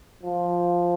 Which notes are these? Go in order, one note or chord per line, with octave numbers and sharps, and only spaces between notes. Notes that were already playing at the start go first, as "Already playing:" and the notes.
F3